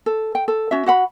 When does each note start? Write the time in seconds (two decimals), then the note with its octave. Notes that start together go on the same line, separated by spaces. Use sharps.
0.06 A4
0.35 G5
0.48 A4
0.71 C#4 F#4 E5
0.86 F#4 F#5 B5